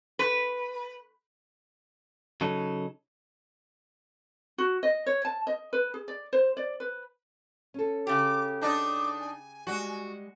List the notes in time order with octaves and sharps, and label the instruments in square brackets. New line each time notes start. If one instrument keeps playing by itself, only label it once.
[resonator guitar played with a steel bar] B4
[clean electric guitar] C#3 F#3 D#4 A4
[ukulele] F#4
D#5
C#5
A5
D#5
B4
G#4
D5
C5
D5
B4
[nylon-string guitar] C#4 A4
[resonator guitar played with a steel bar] C#3 G4 [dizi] D6
[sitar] D4 D#4 [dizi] D6
[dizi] G#5
[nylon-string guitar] G3 G#3 [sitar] F#4